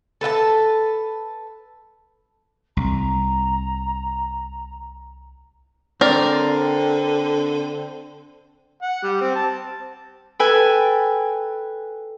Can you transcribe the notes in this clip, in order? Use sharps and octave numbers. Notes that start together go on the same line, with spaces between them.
A4 B4 F5 A5
C2 A#5
D3 C4 A#4 D5
F#5
G3
C4
A5
A4 B4 G5 G#5